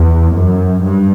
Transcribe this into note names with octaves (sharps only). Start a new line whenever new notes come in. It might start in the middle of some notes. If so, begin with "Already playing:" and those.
Already playing: E2
F#2
G2